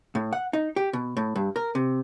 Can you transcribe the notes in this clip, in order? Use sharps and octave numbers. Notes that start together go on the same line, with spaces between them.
A2
F#5
D#4
G4
B2
A2
G2
A#4
C3